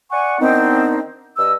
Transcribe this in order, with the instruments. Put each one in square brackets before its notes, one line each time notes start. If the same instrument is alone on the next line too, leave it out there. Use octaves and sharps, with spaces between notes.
[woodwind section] D5 F#5 G#5 C#6
D#3 B3 C4 D4 D#4
G2 D#5 E6